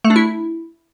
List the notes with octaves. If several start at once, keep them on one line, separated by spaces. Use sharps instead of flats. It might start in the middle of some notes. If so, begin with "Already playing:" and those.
A3
D4
E4